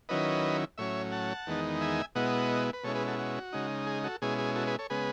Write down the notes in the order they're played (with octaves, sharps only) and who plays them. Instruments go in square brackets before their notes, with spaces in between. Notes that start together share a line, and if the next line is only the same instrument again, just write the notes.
[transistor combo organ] D#3 F#3 C#4 E4 B4 D#5
A2 F#3 C#4 C#5 E5
F#5 A5
E2 D#3 G#3 B3 D#4
E5 G#5
B2 G#3 B3 E4 D#5 F#5
B4
B2 G#3 C#4 E4 A4 C#5
G#4 B4
F#4 A4
F#4
C#3 G#3 D#4
G#4
F#4 A4
B2 G#3 C#4 E4 G#4
G#4
F#4 A4
G#4 B4
A4 C#5
C#3 G#3 B3 G#4 B4